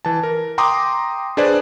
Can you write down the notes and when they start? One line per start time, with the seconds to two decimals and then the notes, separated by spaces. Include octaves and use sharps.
0.05 E3 A5
0.23 A#4
0.58 G5 A#5 C6 D6 D#6
1.37 D4 G#4 B4 C5 D5